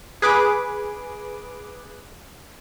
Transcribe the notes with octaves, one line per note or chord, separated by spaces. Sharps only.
G#4 B4 D6